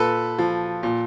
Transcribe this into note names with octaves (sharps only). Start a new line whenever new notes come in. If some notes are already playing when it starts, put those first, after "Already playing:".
Already playing: A#2 A4 B4
F3
A#2